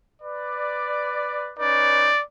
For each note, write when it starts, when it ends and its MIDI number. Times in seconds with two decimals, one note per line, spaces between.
0.22 1.53 71
0.22 1.53 74
1.59 2.12 61
1.59 2.12 63
1.59 2.12 71
1.59 2.23 74